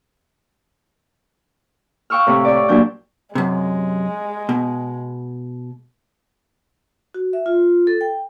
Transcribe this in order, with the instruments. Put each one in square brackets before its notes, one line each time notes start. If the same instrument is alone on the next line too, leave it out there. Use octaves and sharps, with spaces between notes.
[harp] F5 G5 C#6 E6 F6
A2 C3
C#5 D5
A#2 F#3 D4 G6
[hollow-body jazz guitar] F#2 C3 [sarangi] G#3
[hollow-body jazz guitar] B2
[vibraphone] F#4
E5
F4
A4
G5